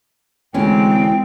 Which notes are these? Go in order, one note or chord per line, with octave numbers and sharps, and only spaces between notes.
D2 E3 G#3 C4 C#4 G5